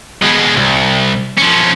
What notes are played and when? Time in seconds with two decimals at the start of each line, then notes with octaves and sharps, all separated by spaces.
0.22 B2 G#3
0.56 C2
1.38 F3 C#4